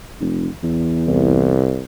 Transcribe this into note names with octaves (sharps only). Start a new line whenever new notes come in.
F1
E2
C2